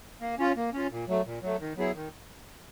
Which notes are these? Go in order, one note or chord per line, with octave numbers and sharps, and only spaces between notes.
A#3
C#4 F4
A#3
C#4 F4
A#2
F#3 A3
A#2
F#3 A3
D#3
F#3 B3 E4 G#4
D#3